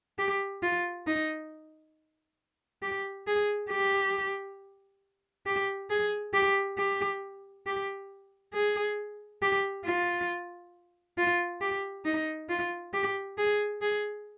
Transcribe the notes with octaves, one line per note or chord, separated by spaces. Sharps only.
G4
F4
D#4
G4
G#4
G4
G4
G#4
G4
G4
G4
G#4
G4
F4
F4
G4
D#4
F4
G4
G#4
G#4